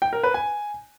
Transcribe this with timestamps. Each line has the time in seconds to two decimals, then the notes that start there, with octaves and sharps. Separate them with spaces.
0.02 G5
0.13 A#4
0.23 B4
0.34 G#5